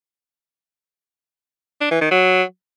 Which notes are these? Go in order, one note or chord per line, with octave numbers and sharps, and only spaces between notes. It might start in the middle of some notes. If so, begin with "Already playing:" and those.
D4
E3
D#3
F#3